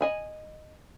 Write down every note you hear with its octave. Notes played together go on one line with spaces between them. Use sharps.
D#5 G#5 B5